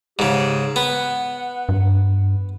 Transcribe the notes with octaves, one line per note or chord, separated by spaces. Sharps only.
G#2 C#3 G4
B3 F#5
G2